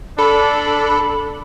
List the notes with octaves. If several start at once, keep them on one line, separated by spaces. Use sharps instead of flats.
D4 A4 B5